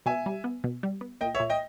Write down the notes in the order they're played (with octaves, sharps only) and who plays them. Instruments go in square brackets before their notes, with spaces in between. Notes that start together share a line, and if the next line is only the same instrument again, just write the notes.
[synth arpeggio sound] B2 [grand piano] E5 G#5
[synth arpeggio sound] G3
B3
B2
G3
B3
[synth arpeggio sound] A#2 [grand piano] D#5 G5
[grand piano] C#5 E5
[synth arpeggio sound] A#2
[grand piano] D#5 G5